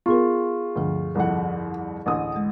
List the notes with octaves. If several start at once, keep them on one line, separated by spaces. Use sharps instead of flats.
B3 F4 G#4 A#4 C#6
D2 G2 D3 F3
C2 F2 F#5
A1 D2 D#6
G#3 F#5